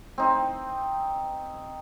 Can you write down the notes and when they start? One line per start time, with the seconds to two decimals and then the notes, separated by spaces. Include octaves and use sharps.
0.18 C4 D#4